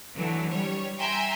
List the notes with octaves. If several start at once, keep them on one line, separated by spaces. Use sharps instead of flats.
D3 E3 F#3 A3
G3 C#5
E5 G5 G#5 A#5 C6